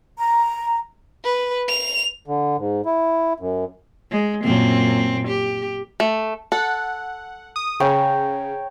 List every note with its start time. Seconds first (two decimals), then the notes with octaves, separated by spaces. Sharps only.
0.19 A#5
1.24 B4
1.68 F7
2.26 D3
2.58 G#2
2.86 E4
3.40 F#2
4.11 G#3
4.44 F#2 A#2 C4
5.28 G4
6.00 A3
6.52 A4 F#5
7.56 D#6
7.80 C#3 C#5 G5 A#5